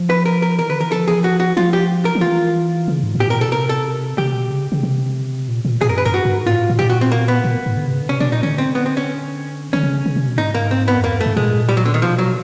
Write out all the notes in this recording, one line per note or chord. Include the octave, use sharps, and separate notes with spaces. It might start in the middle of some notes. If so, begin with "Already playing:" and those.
Already playing: F3
B4
A#4
A#4
E3 A#4
D3 B4
E3 A#4
F3 A4
G#4
F#4
F#4
F3 F4
G4
A#4
F3
E3 F4
C#3
G#2
A2
G4
A#2 A#4
B2 A4
C3 A#4
A4
C3 G4
B2
C#3
C#3
C3
A#2
A#2
A#2 G#4
F#2 A#4
G2 B4
F#2 A#4
G2 F#4
G2
G#2
A2 F4
A2
A#2 G4
F#4
C4
A#3
B3
A#2
G#2
D3
C3
C#3
D3
C3 C#4
B2 D4
A#2 D#4
D3 C#4
C4
B3
C4
C#4
D3 C#4
C3
C#3
C#3
C3
B2
G#2 D#4
A#3
C4
B3
F#2
F2 A#3
G2
A3
G2
A#2 G#3
G3
F#3
D3
D#3
B2 F3
F#3